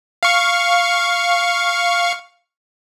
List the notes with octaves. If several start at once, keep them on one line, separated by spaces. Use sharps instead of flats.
F5 C#6